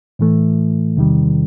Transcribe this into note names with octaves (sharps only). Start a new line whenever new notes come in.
A2 E3 A3
E2 C3 D#3 G3